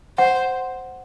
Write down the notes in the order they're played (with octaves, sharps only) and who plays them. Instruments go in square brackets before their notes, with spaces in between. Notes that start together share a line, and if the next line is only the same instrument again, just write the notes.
[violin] C5 [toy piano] F#5